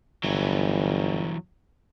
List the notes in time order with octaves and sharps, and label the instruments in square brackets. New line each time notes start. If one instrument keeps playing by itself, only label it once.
[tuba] G1 [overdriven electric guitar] E3 F#3